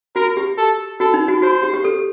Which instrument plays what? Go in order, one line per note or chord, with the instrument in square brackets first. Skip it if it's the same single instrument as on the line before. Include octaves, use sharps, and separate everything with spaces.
[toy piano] F#4 [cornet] A#4
[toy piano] G4
[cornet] A4
[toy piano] F#4 [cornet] A4
[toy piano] D#4
F#4
[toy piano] F#4 [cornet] C5
[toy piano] G4
G4
A4